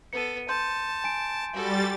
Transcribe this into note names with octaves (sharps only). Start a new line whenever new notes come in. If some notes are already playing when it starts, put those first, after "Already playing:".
B3 A4 C#7 D#7
A5 C6 G6
G#5 D7
G3 F#4 A4 A6